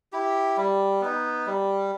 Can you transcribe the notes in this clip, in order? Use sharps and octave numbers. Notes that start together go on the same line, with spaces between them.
E4 G4
G3
B3 D#4
G3